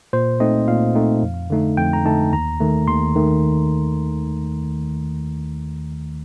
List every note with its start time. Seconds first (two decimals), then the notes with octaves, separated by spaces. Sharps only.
0.13 A#2 C5
0.40 A3 C4 D#4 D#5
0.68 A#2 F5
0.95 A3 C4 D#4
1.23 F2
1.50 D3 A3 D#4
1.77 F2 G5
1.93 A#5
2.05 D3 A3 D#4 A5
2.33 D#2 A#5
2.60 D#3 A3
2.88 D#2 C6
3.16 D#3 A3